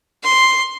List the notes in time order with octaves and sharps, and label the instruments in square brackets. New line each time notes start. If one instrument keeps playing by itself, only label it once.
[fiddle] C6